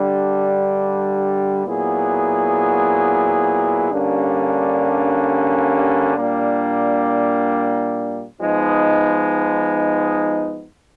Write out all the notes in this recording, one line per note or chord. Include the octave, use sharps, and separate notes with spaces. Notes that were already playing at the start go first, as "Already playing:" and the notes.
Already playing: G2 D3 G3
A#2 F#3 B3 E4 G#4
G2 D3 G3 A#3 C#4
A#2 G3 A#3 D4
F3 G#3 B3 D#4